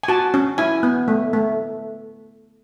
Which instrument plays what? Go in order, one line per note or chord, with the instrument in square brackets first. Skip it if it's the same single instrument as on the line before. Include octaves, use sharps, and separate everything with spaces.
[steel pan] G#5
F#4 A5
C#4
E4 G#5
B3
A3
A3